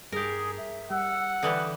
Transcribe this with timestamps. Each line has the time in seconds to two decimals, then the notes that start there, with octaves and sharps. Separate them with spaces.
0.12 G2 G4 G#4 A#4
0.58 E5
0.90 G3 F#5 E6
1.43 D3 E3 G3 D#6